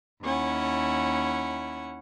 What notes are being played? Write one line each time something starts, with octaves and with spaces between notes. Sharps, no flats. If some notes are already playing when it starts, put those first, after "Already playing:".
D#2 C#4 E4 F#5